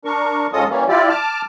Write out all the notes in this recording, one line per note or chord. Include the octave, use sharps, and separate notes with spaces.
D4 A#4 C#6
G#2 C#4 F4 A4 D#5 D#6
E3 G3 A#3 C#4
E4 F4 G4 D5
A5 D6 F6